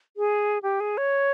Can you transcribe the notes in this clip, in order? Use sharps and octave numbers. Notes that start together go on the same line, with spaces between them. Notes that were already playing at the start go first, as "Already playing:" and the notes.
G#4
G4
G#4
C#5